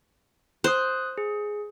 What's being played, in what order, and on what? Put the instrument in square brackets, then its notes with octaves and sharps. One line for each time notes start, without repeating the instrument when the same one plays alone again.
[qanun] C5 [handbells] D#6 F#6
[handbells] G#4